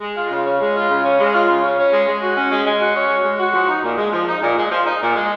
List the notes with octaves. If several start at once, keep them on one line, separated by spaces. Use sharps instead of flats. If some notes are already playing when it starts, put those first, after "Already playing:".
G#3
F4
C#3
C#4
G#3
F4
C#3
C#4
G#3
F4
C#3
C#4
C#4
G#3
G#3
F#4
C#4
G#3
G#3
F#4
C#4
G#3
G#3
F#4
F3
D#4
A#2
G#3
F3
D#4
A#2
G#3
F3
D#4
A#2
G#3